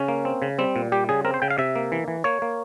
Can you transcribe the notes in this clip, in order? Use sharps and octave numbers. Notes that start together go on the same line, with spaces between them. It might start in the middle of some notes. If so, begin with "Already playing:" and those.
Already playing: C#3 C#4
A#3
C4
C#3
G3 C4
A#2
G3 G4
C#3 G#4
C4 A#4
C5
C#3 G5
F5
C3 E5
A#3
E3
E3
A#3 C#5
A#3